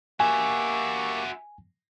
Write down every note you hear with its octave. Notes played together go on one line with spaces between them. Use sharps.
A#3 F#4 G4 E5 G#5 C#6